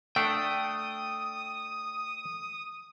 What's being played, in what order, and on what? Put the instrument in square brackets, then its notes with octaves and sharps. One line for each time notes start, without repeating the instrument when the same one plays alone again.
[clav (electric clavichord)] A3 D4 A4 [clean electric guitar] G5 [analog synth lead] D#6